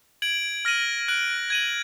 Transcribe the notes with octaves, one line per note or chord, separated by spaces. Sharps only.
G#6 D7 F#7
F6 A#6 D#7 F#7
F#6 D7 F#7
G#6 D#7 F#7